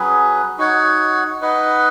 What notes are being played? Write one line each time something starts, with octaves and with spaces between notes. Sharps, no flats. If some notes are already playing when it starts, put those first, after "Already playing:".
Already playing: F#3 C#4 G#4 B4
D#4 F#4 C#5 F#5
D#4 B4 D#5 F#5